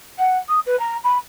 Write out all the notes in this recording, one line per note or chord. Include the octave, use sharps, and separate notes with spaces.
F#5
D#6
B4
A#5
B5